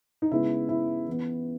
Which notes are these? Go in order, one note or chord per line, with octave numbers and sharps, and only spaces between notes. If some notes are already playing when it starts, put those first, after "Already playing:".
D#4
C#3 G#3 B3 E4
E4
E3 B3